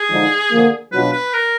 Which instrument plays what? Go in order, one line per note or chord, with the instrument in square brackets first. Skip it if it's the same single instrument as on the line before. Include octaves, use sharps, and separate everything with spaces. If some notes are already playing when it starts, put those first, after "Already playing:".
Already playing: [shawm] G#4
[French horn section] D3 F3 G#3 D#4
D3 F3 A#3
[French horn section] B2 F#3 D4 F4 [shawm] B4
[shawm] B4
A#4